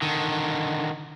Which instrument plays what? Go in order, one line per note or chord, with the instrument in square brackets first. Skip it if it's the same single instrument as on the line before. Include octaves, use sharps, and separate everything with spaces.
[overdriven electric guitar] D3 D#3